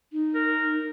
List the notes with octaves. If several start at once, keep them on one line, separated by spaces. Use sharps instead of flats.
D#4
A#4